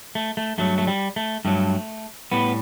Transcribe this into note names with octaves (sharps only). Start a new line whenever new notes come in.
A3
A3
G2 F#3 A3
A3
G3
A3
G2 F#3 A3
A2 G3 B3